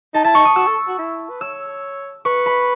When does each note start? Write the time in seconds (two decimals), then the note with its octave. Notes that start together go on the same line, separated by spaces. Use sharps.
0.14 D#4 A5
0.24 E4 A5
0.35 D#4 C#6
0.45 D#6
0.56 F#4 E6
0.67 A4
0.88 F#4
0.99 E4
1.30 B4
1.41 C#5 E6
2.25 B4 C#6
2.46 B5